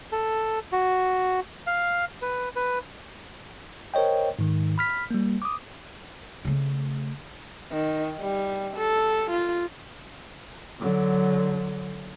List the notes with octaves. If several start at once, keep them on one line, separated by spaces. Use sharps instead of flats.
A4
F#4
F5
B4
B4
A#4 C5 C#5 D#5 G5
G#2 D#3
B5 F6 B6
G3 A#3
D6 D#6
C#3 A3
D#3
G3
A4
F4
D3 F#3